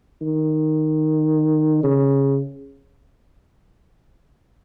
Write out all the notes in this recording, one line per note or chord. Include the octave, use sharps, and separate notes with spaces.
D#3
C#3